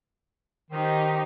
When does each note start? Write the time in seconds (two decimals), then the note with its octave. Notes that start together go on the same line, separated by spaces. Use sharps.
0.70 D#3 D#4 G4 C5